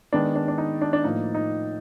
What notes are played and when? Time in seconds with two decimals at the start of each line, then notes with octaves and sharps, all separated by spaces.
0.12 D#3 G#3 B3 D4
0.36 D4
0.48 D4
0.58 D#4
0.81 D4
0.93 D4
1.04 A2 F3 A#3 D#4
1.34 D#4